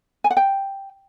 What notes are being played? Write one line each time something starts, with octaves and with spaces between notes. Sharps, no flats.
G#5
F#5
G5